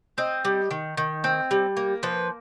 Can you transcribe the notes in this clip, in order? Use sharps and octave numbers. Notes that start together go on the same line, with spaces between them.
C4 D#5
G3
D#3
D#3
C4
G3
A#3
F3 B4